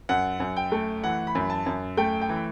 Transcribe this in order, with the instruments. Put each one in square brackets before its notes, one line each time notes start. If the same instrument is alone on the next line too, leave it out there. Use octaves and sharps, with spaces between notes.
[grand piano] F#2 F#5
F#2
G5
A3
E3 F#5
B5
F#2
A5
F#2
A3 G5
G5
E3